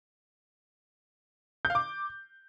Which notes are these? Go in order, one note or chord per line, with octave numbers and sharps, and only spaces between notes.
G6
F5
D6